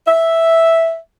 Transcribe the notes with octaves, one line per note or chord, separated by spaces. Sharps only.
E5